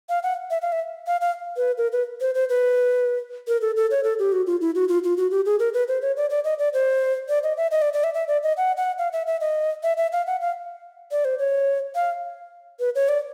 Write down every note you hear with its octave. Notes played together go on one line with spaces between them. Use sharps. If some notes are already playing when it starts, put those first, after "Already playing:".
F5
F#5
E5
F5
E5
F5
F5
B4
A#4
B4
C5
C5
B4
A#4
A4
A4
C#5
A4
G4
F#4
F4
E4
F#4
F4
F4
F#4
G4
G#4
A#4
B4
C5
C#5
D5
D5
D#5
D5
C5
D5
D#5
E5
D#5
D5
D5
E5
E5
D5
D#5
F#5
F#5
F5
E5
E5
D#5
E5
E5
F5
F#5
F5
D5
C5
C#5
F5
B4
C#5
D5